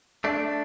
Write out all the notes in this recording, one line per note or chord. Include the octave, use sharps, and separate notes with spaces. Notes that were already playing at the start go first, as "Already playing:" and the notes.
A3 D4